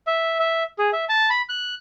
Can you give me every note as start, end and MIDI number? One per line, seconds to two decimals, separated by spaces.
0.07 0.38 76
0.39 0.63 76
0.79 0.90 68
0.93 1.05 76
1.09 1.29 81
1.30 1.42 83
1.49 1.75 90